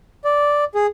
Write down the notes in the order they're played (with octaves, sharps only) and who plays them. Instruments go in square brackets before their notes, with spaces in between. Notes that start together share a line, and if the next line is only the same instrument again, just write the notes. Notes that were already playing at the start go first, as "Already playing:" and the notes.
[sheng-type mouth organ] D5
G#4